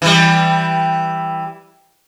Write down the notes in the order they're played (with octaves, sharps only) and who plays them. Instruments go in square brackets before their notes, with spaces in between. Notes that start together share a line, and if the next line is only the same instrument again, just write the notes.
[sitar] E3 G3